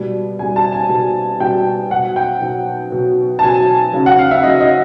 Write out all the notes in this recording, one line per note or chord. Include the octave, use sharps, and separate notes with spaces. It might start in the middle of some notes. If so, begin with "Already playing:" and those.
Already playing: B2 G3
B2 G3 G#5
A5
G#5
B2 G3
B2 G3 G5
B2 F#3 F#5
G5
B2 F#3
B2 F#3
A5
B2 F#3 G#5
C#3 F#3
F#5
F5
E5
C#3 F#3 D#5
D#5